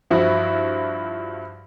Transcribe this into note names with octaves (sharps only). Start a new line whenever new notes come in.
G2 F3 E4 F#4